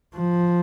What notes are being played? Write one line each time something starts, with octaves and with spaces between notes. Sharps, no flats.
F3